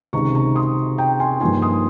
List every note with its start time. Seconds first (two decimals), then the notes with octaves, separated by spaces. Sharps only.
0.13 C#2 C3 D#3 A#5 C#6
0.35 A#5 C#6
0.55 C6 D#6
0.98 G5 A#5
1.20 G#5 C6
1.40 G2 F3 A#3 D#4 G#5 C6
1.62 C6 D#6